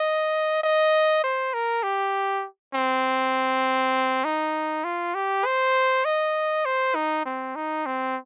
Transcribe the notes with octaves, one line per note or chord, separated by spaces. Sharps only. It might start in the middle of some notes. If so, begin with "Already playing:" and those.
Already playing: D#5
D#5
C5
A#4
G4
C4
D#4
F4
G4
C5
D#5
C5
D#4
C4
D#4
C4